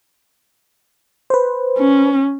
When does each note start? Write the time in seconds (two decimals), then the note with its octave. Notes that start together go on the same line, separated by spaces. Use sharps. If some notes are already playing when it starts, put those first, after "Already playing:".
1.30 B4 C5
1.79 C#4